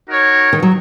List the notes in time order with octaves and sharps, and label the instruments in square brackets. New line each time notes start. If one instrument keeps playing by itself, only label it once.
[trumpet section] D#4 F#4 A#4 C#5
[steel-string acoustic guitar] D#3
F#3